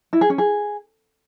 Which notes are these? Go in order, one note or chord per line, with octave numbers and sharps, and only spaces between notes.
E4
G#4
C#4
G#4